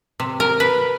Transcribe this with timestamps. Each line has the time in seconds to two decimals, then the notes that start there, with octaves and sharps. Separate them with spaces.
0.20 C3
0.40 A#4
0.60 B4